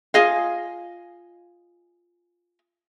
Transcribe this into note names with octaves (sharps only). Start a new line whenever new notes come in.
F4 G#4 D#5 F5